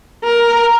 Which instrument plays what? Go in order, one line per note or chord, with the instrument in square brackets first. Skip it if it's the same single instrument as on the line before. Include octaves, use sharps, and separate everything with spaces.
[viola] A#4